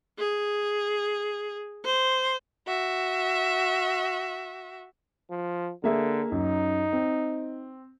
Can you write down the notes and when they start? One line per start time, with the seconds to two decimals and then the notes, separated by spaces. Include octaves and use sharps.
0.18 G#4
1.84 C5
2.67 F#4 E5
5.31 F3
5.84 D3 A#3 G#4 E5
6.32 F#2 D#4
6.93 C4